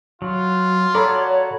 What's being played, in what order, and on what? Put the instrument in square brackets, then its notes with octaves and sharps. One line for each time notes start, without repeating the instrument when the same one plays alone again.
[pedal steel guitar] F#3 [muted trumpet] F4
[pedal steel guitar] F#4 D5 [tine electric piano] A4 A#5 B5 [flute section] C#5